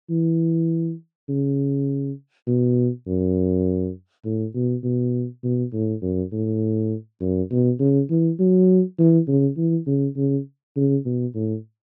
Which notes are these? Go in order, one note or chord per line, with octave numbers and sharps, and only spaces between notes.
E3
C#3
B2
F#2
A2
B2
B2
B2
A2
F#2
A2
F#2
B2
C#3
E3
F#3
E3
C#3
E3
C#3
C#3
C#3
B2
A2